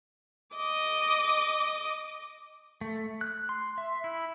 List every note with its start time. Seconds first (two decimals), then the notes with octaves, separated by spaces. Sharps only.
0.56 D#5 D6
2.81 A3
3.21 F#6
3.49 C6
3.78 E5
4.04 E4